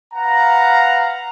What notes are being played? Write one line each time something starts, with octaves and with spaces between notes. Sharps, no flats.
B4 F5 F#5 A#5